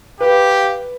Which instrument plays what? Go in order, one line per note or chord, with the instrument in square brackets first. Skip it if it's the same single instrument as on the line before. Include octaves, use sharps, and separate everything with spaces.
[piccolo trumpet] G4 [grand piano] B4 [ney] F5